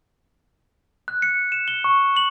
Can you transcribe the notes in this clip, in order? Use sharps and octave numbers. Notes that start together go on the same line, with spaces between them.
F#6
C#7
E7
G7
C#6
F#7